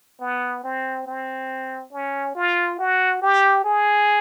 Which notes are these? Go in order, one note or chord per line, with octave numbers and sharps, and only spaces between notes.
B3
C4
C4
C#4
F4
F#4
G4
G#4